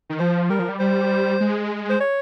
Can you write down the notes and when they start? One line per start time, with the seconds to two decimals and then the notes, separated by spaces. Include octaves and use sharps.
0.10 D#3
0.19 F3 C5
0.50 G3 A#4
0.59 F3
0.69 G3
0.80 G3 C5
1.40 G#3
1.90 C5
2.01 C#5